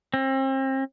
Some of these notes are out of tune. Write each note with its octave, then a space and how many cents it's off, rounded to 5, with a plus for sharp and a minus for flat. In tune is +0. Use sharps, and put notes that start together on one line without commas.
C4 +35